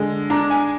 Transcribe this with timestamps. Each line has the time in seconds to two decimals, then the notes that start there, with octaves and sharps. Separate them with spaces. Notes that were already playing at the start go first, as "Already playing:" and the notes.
Already playing: D3 G#3
0.30 D4 A#5
0.50 G#5